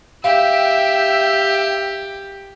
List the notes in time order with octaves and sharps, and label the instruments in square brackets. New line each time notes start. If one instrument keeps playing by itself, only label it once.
[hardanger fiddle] G4 [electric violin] E5 G5 [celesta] F5